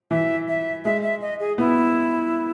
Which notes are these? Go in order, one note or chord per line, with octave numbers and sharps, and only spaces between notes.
E3 E5
E5
G#3 E5
E5
D#5
G#4
B3 E4